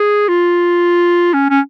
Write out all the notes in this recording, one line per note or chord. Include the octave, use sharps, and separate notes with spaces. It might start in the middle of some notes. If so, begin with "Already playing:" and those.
Already playing: G#4
F4
C#4
C#4